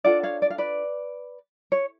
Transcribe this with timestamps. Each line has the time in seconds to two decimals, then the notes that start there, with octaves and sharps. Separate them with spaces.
0.05 D4 F4 A4 D5 F#5
0.23 C#5 F5
0.42 D5
0.50 F5
0.58 B4 D5
1.72 C#5